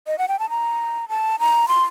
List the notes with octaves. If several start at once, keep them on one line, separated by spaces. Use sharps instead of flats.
D#5
F#5
G5
A5
A#5
A5
A#5
C6